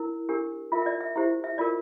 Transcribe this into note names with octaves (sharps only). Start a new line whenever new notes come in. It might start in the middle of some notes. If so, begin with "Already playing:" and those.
Already playing: E4 A#4
D4 G4 A#4
F4 A#4 E5
E5
D5
E5
E4 G4 C5 E5
E5
F4 A#4 D5